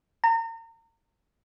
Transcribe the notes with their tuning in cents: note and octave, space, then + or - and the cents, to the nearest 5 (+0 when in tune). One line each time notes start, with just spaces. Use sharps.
A#5 -35